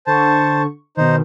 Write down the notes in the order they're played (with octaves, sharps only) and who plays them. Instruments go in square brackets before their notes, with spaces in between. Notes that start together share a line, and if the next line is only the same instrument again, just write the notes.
[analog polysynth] D3 C#6 [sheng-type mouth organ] C5 A5
[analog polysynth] B2 D#3 [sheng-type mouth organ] D#4 C5